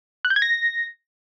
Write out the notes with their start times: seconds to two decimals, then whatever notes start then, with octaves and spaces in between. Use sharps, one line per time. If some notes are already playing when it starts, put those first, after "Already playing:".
0.25 F#6
0.30 G6
0.36 G#6
0.42 A#6